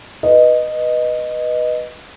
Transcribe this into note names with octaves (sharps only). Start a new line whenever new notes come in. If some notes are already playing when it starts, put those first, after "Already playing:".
B4 D#5